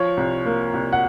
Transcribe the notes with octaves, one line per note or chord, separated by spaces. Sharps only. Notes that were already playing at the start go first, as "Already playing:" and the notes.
Already playing: F3 C#5
C2
A#3
C2
F#5